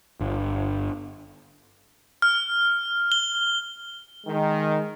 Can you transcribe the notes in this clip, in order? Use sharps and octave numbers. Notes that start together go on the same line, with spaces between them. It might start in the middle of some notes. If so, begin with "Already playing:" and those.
G1
F6
G7
D#3 G#3